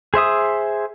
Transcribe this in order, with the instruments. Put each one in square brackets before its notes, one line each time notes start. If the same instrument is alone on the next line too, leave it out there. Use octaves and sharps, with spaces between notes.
[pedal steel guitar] G#4 C5 E5 D#6